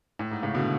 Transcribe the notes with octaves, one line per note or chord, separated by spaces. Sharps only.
A2
G#2
A2 C#3
B2 D3